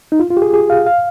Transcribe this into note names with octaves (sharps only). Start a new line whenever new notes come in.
D#4
F4
F4
G4
G#4
G#4
F5
F5